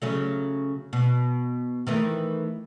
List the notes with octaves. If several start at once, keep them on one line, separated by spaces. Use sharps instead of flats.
C#3 F#3 A3
B2
D#3 E3 A3